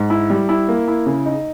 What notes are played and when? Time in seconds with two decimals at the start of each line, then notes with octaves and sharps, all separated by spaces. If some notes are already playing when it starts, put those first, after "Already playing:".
Already playing: G#2
0.10 E4
0.30 G3
0.49 E4
0.68 A#3
0.88 E4
1.06 C#3
1.26 D#4